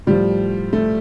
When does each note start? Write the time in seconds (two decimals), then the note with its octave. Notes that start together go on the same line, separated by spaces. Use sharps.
0.07 A2 F3 G3
0.73 A3